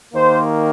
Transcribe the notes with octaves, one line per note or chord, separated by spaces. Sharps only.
D#2 D#3 A#3 C5